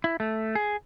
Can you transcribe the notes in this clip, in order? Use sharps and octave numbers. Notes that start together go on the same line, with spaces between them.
E4
A3
G#4